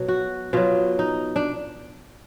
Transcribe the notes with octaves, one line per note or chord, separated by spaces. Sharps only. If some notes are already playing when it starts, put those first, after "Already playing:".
Already playing: B2 F#3
F#4
B2 F#3 F4
D#4
D4